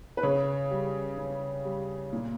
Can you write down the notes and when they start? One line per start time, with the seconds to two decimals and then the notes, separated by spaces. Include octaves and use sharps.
0.17 B4
0.23 C#3 C#5
0.71 G3
1.17 C#3
1.65 G3
2.13 A#2